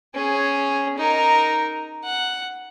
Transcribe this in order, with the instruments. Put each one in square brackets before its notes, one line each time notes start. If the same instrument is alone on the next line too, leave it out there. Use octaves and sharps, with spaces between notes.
[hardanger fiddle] C#4 G#4
D#4 A#4
F#5